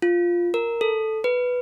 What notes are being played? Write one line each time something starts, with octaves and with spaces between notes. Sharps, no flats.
F4
A#4
A4
B4